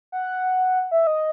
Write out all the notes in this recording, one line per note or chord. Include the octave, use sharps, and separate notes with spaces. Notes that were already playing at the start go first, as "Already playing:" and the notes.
F#5
E5
D#5